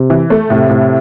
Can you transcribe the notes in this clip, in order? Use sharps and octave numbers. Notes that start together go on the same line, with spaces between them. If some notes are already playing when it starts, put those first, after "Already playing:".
Already playing: C3
E3
A3
A2 C3
A2